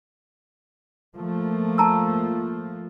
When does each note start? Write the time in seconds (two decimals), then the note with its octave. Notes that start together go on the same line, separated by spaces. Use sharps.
1.16 F3 A3 A#3
1.78 A5 A#5 E6